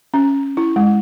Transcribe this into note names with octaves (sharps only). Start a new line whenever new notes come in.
C#4
E4
G#3